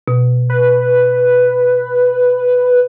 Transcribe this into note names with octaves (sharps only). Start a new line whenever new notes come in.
B2
B4